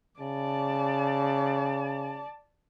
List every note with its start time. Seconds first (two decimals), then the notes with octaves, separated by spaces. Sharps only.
0.20 C#3 D5 A5